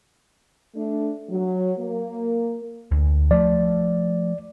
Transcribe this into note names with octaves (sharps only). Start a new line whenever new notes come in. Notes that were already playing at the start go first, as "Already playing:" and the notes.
A3 D4
F#3
A#3
D2
F3 A3 D5